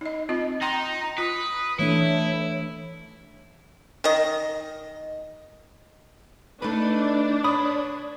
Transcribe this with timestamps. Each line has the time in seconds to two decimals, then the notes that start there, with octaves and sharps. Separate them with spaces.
0.01 D#4 D#5
0.29 C4 F4 D#5
0.62 D#4 G5 A#5 C6
1.18 F4 B4 D#6
1.79 E3 A3 D4 E4 C#5
4.04 D#3 D#5
6.62 A3 D4 D#4 B4
7.44 B4 C#5 B5 D#6